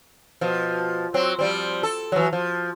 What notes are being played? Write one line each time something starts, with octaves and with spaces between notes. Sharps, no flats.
B2 F3
F#3 C4
F3 G3 C4
A4
E3 F#3
F3